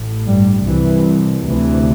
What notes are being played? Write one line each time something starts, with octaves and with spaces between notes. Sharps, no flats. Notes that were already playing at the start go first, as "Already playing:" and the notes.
Already playing: A1 A2
G2 G3
C2 C3 E3
D2 C3 E3